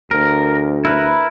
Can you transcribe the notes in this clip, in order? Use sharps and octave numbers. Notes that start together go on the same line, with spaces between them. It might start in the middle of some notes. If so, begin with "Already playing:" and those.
D2 A#4
E4 A#4 B4